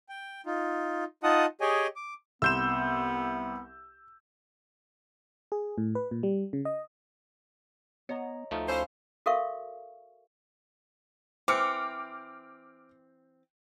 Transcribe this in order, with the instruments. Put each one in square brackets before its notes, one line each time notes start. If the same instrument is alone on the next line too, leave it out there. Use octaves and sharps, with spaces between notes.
[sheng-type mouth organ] G5
D#4 F4
D#4 F4 D#5 F#5 A5 D#6
G4 G#4 C#5 D#5 G5 G#5
D6
[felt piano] C2 C6 [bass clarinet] B3 [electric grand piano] E6 G6 E7
[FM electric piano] G#4
A2
B4
A#2
G3
C#3
D#5
[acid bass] B3 [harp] C#5 D#5 A#5
[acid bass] D2 [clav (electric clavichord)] F3 A3 D#4 [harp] A6
[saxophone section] C#4 E4 C5 [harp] F5 D#6
[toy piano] F#4 A4 A#4 E5 F5 C#6
[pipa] E3 C4 [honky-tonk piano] D6 F6 C#7